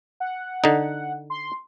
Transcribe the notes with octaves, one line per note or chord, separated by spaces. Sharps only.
F#5
D3 D#4
C6